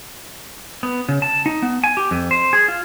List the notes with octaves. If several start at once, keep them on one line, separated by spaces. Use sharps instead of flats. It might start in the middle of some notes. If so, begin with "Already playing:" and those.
B3
C#3
A5
D#4
B3
G#5
G4
F2
C5
G#4
F4